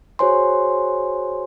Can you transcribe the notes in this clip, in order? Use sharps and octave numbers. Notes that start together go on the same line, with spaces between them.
F#4 G#4 C5 C#5 G#5 C6